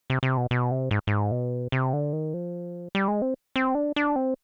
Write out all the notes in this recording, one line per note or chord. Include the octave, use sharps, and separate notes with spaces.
C3
C3
B2
B2
C3
G#2
G#2
B2
C3
D3
D#3
F3
G3
G#3
C4
C4
D4
D4
C4